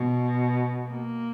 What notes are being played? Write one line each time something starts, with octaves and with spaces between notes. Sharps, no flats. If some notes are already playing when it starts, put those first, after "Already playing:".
Already playing: B2
A#3